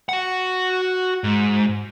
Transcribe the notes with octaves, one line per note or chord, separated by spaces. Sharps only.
F#4 F#5
G#2